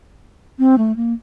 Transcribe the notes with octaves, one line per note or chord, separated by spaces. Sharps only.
C4
A3
A#3